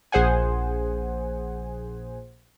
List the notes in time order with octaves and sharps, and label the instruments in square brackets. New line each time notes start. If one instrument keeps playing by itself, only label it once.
[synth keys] A#1 G#4 C5 F#5 G#5